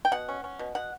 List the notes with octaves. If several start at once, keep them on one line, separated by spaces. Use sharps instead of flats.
G5
B2 F#5
C#4
C#4
B2
B2 F#5